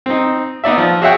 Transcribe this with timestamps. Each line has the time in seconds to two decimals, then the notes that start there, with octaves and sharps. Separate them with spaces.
0.06 C4 D#4
0.64 B3 D#4 D5 E5
0.78 F3
1.02 F#4 G#4 C#5 E5 F#5 G5